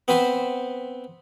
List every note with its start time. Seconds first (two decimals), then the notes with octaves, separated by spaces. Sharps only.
0.08 B3 C4 B4 C5